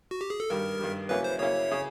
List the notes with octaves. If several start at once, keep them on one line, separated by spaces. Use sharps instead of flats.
F#4
G4
G#4
A4
G2 D#3 G3 A#4
G2 D#3 G3
C#3 F#3 A#3 C#4 E4 B4
C5
C#3 F#3 A#3 C#4 E4 C#5
C#3